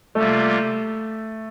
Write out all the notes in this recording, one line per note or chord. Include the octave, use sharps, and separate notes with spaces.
C3 G3 A3 A#3 F4